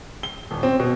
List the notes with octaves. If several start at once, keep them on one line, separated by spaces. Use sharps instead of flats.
G7
D#1
C4
B2